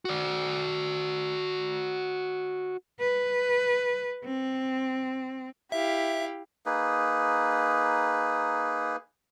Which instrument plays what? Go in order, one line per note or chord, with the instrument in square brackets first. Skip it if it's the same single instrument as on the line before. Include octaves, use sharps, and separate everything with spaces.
[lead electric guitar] F#4 D5
[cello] B4
C4
[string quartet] E4 G4 F5 [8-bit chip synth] E5
[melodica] A#3 D#4 G#4 B4